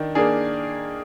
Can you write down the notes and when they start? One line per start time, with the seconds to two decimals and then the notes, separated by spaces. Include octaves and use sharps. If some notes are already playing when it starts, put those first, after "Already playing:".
Already playing: D#3 D4
0.15 A#3 D4 G#4